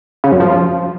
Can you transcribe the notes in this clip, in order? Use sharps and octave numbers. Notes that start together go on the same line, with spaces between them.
C#3
F#2
F3